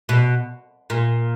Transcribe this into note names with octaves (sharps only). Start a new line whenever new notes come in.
B2
A#2